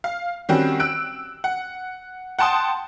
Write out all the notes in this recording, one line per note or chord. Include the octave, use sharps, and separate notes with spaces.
F5
D#3 G3 C4 C#4 F#4
E6 F#6 D7
F#5
F#5 G5 A5 C6 D#6